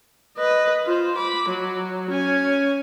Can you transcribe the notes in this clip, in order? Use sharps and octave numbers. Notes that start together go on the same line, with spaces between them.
B4 D#5
F4 C5
B5 D6
F#3
C#4 G#5